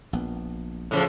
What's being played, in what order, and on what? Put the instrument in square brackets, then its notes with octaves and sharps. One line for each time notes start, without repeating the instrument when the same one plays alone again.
[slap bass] A#1 B3
[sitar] A2 C#3 F3